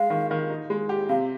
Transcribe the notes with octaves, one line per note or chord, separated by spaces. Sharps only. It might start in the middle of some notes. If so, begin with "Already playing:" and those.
Already playing: G#3 F5
D#3
D#3
D#4
G#3
G4
C3 F5